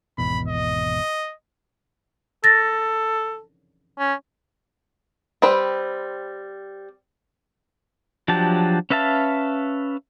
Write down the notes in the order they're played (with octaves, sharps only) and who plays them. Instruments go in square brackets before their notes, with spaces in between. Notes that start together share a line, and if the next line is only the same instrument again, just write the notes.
[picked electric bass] G#1 E2 B2 [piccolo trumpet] B5
[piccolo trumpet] D#5
[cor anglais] A4 [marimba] A6 A#6
[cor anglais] C#4
[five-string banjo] G3 C4 B4
[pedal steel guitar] F3 F#3 D4 G4 A5
C#4 B4 E5 F5 A5